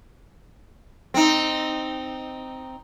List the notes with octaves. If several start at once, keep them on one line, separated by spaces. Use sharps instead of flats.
C4 D#4